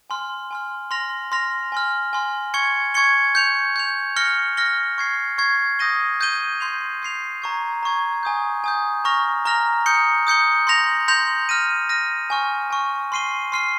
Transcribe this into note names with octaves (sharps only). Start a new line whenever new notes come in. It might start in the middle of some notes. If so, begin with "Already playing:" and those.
G#5 C6 F6
G#5 C6 F6
C6 F6 A#6 F7
C6 F6 A#6 F7
G#5 C6 F6
G#5 C6 F6
C#6 G#6 C#7 G7
C#6 G#6 C#7 G7
G6 C#7 F7
G6 C#7 F7
F6 A#6 C#7 G7
F6 A#6 C#7 G7
C#6 G#6 C7
C#6 G#6 C7
D#6 G6 A#6 D#7 G7
D#6 G6 A#6 D#7 G7
C6 G6 C7 F7
C6 G6 C7 F7
A#5 C#6 G#6
A#5 C#6 G#6
G#5 D#6 G6
G#5 D#6 G6
A#5 C#6 F6 A#6 F7
A#5 C#6 F6 A#6 F7
D#6 G6 C#7 G7
D#6 G6 C#7 G7
C6 G6 A#6 F7
C6 G6 A#6 F7
F6 A#6 D#7
F6 A#6 D#7
G#5 C#6 F6
G#5 C#6 F6
C6 F6 C7 D#7 G7
C6 F6 C7 D#7 G7